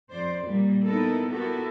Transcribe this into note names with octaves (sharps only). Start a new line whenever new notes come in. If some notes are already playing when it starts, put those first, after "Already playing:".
F2 C5 D5
A#2 G3 A#3
B3 D#4 E4 A4 A#4
B3 E4 F#4 G4 A4 A#4